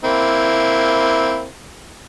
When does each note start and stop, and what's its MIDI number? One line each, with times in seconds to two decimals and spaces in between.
0.04 1.48 58
0.04 1.48 60
0.04 1.48 64